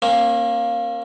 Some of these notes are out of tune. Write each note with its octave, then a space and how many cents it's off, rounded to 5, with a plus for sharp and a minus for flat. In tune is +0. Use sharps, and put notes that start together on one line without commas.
A#3 +0 C#4 -45